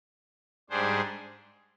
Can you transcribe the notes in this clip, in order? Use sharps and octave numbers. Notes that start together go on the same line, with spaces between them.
G#2 G3 D4 G#4 C5